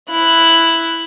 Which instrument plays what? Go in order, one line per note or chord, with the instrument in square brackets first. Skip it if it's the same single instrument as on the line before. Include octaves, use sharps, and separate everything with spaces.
[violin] E4 F#6